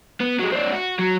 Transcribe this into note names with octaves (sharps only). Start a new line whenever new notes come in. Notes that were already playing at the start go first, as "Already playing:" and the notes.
B3
F#3 G#3
C4 D4
F#4
F#3